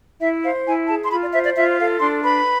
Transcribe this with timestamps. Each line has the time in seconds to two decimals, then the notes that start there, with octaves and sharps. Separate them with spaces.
0.21 E4 E5
0.44 C5 F5
0.66 E4 G#5
0.88 G#4 A5
1.04 C6
1.11 F4 B5
1.22 D5
1.33 C5 E5
1.45 D5
1.56 F4 E5
1.79 A4 F5
2.01 D4 C6
2.23 B4 B5